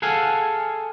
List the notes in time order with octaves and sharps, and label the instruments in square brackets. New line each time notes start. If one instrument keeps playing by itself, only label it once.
[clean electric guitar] G#4 A4 F5 F#5 G#5